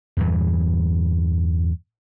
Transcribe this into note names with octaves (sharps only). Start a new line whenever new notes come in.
E2 G2 A#2 E3